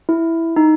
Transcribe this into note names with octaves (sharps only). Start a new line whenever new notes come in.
E4
D#4